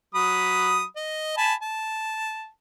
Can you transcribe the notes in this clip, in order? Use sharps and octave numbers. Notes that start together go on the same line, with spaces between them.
F#3 B5 D#6
D#5
G#5 A5 B5
A5